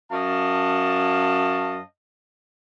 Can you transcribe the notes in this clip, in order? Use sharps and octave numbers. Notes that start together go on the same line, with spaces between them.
F#2 C#5 D#5 F5 A5